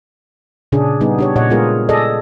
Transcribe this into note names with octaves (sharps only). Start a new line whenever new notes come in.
A#2 C#3 C#4 D4 G#4
G3 B3 D#4 G#4
D4 G4 C#5
A#2 C#5 D#5 F#5
G#3 B3 F4 G#4 A#4
G#4 A4 D5 D#5